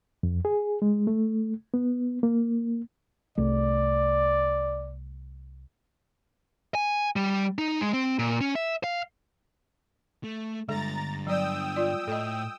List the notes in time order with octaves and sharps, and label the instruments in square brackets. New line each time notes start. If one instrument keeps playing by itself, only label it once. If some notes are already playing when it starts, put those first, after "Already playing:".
[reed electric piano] F2
G#4
G#3
A3
B3
A#3
[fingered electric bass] C2 A3 [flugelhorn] D5
[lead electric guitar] G#5
G3
D#4
G#3
C4
A#2
C#4
E5
F5
A3
[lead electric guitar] G2 D3 [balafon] G#3 A4 [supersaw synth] A#5 A6
[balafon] F#3 D5 [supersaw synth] G5 D#6 E6
[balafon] F4 D5
[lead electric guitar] A2 [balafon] A4 D#5